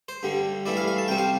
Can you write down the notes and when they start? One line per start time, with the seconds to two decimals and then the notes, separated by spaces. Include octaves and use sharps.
0.08 C5
0.23 G2 D3 G3
0.66 G2 E3 A3 E4 D5
0.77 F5
0.88 F5
0.98 A5
1.08 C3 G3 C4 G5
1.18 F5